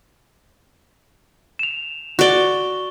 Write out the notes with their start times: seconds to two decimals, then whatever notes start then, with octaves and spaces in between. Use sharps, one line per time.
1.59 E7 F7
2.19 F#4 D5 C#6 G7